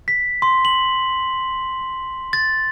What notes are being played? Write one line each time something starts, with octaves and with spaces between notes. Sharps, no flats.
B6
C6
F#7
A6